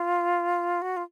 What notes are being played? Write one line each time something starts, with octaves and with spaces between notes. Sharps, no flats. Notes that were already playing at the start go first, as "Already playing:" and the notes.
Already playing: F4
F#4
F4